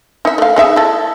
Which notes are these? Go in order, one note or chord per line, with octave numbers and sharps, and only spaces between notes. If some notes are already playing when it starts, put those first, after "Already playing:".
D#4 E5
A3 F5
G#3 D#4 E5
E4 A4